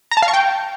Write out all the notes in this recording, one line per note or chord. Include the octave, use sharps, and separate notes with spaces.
A#5
A5
F5
C#6
G5